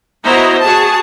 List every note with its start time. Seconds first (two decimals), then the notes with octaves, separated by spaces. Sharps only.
0.25 B3 E4 F#4 C5 D#5 A#5
0.62 F#4 G#4 A5